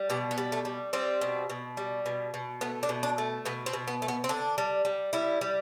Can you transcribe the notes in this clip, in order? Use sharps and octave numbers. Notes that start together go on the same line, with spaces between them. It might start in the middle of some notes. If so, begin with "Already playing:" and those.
Already playing: G3
B2 G4
B3
G3
A3
G3
G3 C4
B2
B2
G3
B2
B2
A3 B3
D4
B2
D4
A3
B2 B3
C4
B2
B3
A3
B3
C4
D3 D4
G3
G3
G3 E4
G3